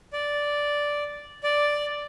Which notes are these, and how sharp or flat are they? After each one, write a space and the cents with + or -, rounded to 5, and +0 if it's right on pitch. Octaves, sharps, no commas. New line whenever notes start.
D5 -5
D5 +0